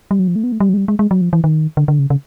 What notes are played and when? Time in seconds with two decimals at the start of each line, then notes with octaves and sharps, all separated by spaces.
0.11 G3
0.19 F#3
0.28 F3
0.36 A3
0.44 B3
0.52 A3
0.60 G3
0.69 F#3
0.74 G#3
0.77 G3
0.88 G#3
0.99 G#3
1.11 F#3
1.21 F3
1.33 E3
1.44 D#3
1.77 D3
1.88 D3
1.99 C#3
2.10 C#3